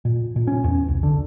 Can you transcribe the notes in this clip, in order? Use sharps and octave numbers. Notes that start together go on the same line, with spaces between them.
A#2
A#2
C#4
E2
C2
D3